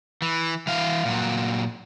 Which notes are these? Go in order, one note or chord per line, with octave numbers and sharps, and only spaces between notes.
E3
E3 F5
A#2 F#3